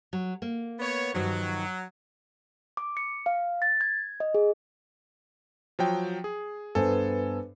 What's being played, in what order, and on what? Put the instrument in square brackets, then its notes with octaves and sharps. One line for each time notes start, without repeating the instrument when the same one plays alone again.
[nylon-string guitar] F#3
A#3
[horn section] B3 C#5
[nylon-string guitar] G2 D#3 F3 [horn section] F#3
[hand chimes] D6
C#7
F5
A6
G#6
D#5
G#4
[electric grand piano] F3 F#3 G5
G#4
[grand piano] G2 B3 C5 [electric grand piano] A4 G#5